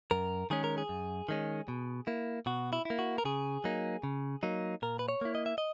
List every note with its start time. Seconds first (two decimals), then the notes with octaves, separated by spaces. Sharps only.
0.11 F#2 A#4
0.50 D#3 G#3 C#4 G#4
0.64 A#4
0.78 G#4
0.89 F#2
1.29 D#3 G#3 C#4
1.68 B2
2.07 A#3 E4
2.46 B2 F#4
2.73 E4
2.85 A#3 E4
2.99 F#4
3.18 A#4
3.25 C#3 G#4
3.64 F#3 A#3 D#4
4.03 C#3
4.43 F#3 A#3 D#4
4.82 A#2 A#4
4.99 B4
5.09 C#5
5.21 A#3 E4
5.35 D#5
5.46 E5
5.58 D#5